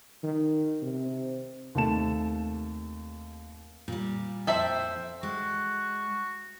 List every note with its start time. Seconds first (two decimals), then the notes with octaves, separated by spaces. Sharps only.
0.23 D#3
0.82 C3
1.75 D#2 C3 A3 A5 E7
3.88 A#2 G3
4.47 F2 A4 C5 E5 G5 B5
5.23 G#3 F#4